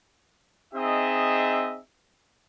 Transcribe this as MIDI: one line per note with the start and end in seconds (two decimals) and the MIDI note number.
0.74 1.79 60
0.74 1.79 63
0.74 1.79 68
0.74 1.79 75
0.74 1.79 76